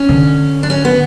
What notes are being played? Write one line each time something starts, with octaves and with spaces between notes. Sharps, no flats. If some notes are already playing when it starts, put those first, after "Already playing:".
Already playing: C#4
D3
D4
C#4
B3